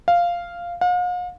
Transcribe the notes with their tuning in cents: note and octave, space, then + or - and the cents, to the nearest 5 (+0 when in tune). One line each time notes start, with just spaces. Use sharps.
F5 -5
F5 +45